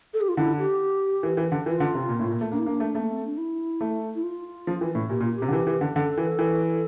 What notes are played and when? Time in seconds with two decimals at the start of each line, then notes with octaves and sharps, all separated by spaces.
0.14 A4
0.21 G4
0.29 F4
0.37 D3 E4
0.58 G4
1.23 E3
1.37 E3
1.52 D3
1.66 E3 F4
1.80 D3
1.94 C3
2.09 A#2
2.19 A2
2.31 A#2
2.41 A3
2.52 A#3 D4
2.59 E4
2.66 A#3 D4
2.80 A3
2.95 A3
3.00 A#3
3.12 C4
3.26 D4
3.38 E4
3.81 A3
4.15 E4
4.23 F4
4.67 F3
4.81 E3
4.95 A2
5.10 A#2 G4
5.20 A#2 F4
5.35 G4
5.42 C3
5.48 D3
5.53 E3
5.67 E3
5.81 D3
5.96 D3 A4
6.17 E3
6.39 E3